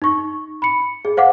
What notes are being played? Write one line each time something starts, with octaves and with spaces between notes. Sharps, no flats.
D#4 C#6
B5 C#7
G#4
C5 F5 F#5 D6